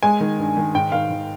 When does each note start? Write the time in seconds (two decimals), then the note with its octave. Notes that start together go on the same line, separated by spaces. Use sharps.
0.03 G#3 G#5
0.20 D#3
0.38 G2
0.57 D#3
0.75 G#2 G5
0.92 D#3 F5
1.10 D#3